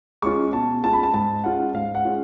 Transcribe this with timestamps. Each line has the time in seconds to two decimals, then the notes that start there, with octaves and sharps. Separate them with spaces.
0.22 G#3 C#4 F4 C#6
0.53 B2 A5
0.83 G#3 C#4 F4 A5
0.93 B5
1.03 A5
1.14 G#2 A5
1.44 G#3 C#4 F4 F#5
1.74 G#2 F5
1.95 F#5
2.05 G#3 C#4 F4